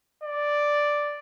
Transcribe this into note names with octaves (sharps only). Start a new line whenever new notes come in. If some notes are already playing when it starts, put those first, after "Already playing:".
D5